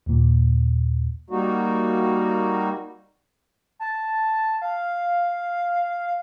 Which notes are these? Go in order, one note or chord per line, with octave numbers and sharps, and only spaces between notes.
D#2 A#2
G3 A#3 D#4 F#4
A5
F5